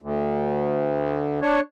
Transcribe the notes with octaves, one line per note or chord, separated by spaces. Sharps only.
D2
D4 C#5